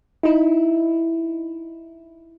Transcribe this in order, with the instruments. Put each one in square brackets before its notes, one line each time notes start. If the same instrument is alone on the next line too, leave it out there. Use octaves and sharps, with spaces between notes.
[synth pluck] D#4 E4